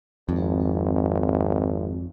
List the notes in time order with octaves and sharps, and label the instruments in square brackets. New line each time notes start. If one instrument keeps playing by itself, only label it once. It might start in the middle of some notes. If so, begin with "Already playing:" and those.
[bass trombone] G#1 [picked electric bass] F2